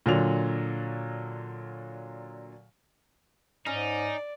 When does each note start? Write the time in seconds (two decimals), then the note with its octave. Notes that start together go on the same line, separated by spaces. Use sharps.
0.06 A#2 D3 F#3 F7
3.66 G#2 C#4 D#4 D5